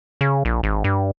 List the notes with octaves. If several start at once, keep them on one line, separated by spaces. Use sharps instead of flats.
C#3
A#1
G#1
G2